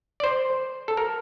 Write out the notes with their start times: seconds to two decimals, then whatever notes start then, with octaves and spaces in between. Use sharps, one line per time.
0.20 D5
0.24 C5
0.88 A4
0.97 A#4